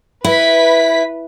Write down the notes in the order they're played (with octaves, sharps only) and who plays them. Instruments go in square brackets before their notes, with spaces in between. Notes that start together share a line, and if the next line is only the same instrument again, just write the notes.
[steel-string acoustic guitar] E4 [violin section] B4 B6